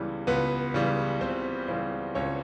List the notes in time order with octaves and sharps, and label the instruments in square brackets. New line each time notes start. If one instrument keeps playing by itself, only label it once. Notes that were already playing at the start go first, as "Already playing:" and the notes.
Already playing: [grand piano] C#2 C#3 E3 G3 B3
C#2 B3 B4
C#3 E3 G3
C#2 C4 C5
C#3 E3 G3 C4 C5
C#2 C#4 C#5